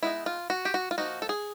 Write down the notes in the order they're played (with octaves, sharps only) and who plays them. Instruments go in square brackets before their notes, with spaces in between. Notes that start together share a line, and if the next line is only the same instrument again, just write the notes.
[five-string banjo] G#3 B3 D#4 E4
F4
F#4
G4
F#4
F4
F3 A#3 D#4 F#4
A4
G#4